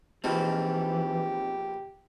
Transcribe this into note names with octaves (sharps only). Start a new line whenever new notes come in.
A#1 B2 E3 F3 C4 D#4 G4